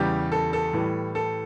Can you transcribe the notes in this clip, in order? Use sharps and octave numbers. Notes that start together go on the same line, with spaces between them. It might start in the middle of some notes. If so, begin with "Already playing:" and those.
Already playing: E2 C#3 E3 G3 G4
A4
A4
A2 E3 G3
A4